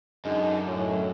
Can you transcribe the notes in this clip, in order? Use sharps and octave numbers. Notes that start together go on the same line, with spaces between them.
F#2 D3 G#3 D#4
A2 C#4